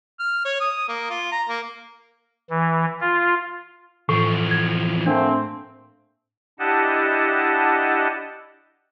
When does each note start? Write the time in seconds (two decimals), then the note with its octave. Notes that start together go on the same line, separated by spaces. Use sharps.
0.19 F6
0.45 C#5
0.60 D#6
0.88 A#3
1.10 F4
1.32 A#5
1.49 A#3
2.50 E3
3.01 F4
4.09 E2 A2 F3
4.51 G#6
5.06 A3 A#3 C4 D4
6.59 D4 E4 G4 D#5 F#5 A5